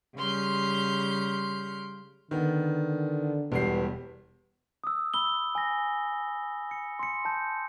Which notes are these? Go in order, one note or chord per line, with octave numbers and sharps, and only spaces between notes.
C#3 G3 C6 F6 G6
D3 D#3 B3
E1 G3 B3 C7
D#6 E6
B5 E6 G7
G#5 A#6
C#7
C6 C#7
A5 G6